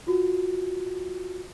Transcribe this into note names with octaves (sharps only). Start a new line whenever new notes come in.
F4 F#4